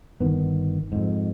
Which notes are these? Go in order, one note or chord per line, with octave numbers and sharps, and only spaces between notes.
G1 D#3 B3
F2 G#2